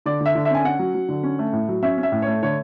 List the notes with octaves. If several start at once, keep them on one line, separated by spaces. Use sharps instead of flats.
D3 D5
D3
E5
D3
E5
C#4 G#5
C#4 F#5
F#3
F#3
D3
C#4
A3
A2
F#3
C#4 E5
C#4
E5
A2
A3 C#5
D3 C#5